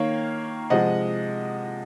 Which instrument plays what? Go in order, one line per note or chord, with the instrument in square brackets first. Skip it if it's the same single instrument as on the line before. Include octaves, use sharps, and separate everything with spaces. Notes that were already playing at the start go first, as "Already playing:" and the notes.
Already playing: [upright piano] D#3 A#3 C#5 F5
C3 F3 G#3 D#5 F#5